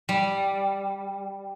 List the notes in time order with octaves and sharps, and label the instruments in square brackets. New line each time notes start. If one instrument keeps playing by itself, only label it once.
[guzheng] G3